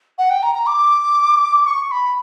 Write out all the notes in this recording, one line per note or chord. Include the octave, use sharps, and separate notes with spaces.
F#5
G5
A#5
A#5
D6
D6
C#6
C#6
B5